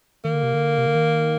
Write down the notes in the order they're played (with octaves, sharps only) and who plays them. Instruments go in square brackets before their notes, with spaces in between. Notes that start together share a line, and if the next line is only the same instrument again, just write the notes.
[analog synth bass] D#3 [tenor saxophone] A#3
[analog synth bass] D3
C3
D3
C3
D3
D#3